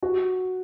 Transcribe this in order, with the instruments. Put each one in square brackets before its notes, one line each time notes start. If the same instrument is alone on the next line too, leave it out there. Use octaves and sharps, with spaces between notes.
[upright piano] F#4